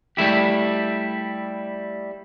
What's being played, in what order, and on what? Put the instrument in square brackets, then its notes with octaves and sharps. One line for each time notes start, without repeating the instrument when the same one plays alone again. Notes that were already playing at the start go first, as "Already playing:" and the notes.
[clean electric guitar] G3 A3 E4 G4